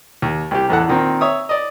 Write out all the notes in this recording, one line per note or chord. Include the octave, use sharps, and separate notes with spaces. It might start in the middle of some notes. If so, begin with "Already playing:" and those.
D#2
C2 G4
A1 E2 A4 F#5
A#2 D#3 C4
C#5 E5 D#6
D5 D#5